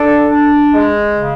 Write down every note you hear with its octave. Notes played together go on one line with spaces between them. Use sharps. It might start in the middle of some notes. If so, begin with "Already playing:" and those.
Already playing: D4 A4
D4
G#3
C#3